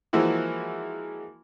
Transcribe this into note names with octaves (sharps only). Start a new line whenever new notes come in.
E3 F3 G#3 A#3 E4 F#4